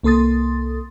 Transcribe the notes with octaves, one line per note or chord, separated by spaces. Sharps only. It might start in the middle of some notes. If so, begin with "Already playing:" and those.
C2 A#3 A4 C6 D#6 A6